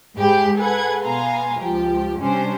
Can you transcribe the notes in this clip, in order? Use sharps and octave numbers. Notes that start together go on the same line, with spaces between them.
G#2 G#3 G4 G#4 B5 G6
G#4 A4 B4 F#5 G#6
B2 B3 F5 G#5 A#5 C6
C#2 F3 G4
C3 G3 C#4 D4 C5